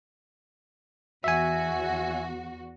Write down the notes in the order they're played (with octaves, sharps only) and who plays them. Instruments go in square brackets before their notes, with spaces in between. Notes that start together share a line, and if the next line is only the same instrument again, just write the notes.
[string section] E2 F#4 [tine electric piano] E5 G#5